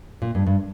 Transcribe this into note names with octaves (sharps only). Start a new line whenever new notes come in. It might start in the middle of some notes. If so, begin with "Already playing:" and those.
A#2
G2
G2